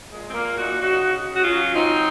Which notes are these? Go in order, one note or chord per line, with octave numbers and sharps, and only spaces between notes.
A#2 G#3
C4
A#2 A#3
A#2 D#4 F#4
C#3 D#4 F#4
C#3
C#3
F#4
C#4 F4
F#3
F#3 C4 D#4